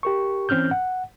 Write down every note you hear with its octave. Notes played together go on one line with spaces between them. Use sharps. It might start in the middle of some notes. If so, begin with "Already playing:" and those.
G4 A#4 C#6
E3 C4 C#4 F6 G6
F#5